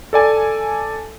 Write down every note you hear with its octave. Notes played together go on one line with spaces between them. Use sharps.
A4 D5 G#5 A5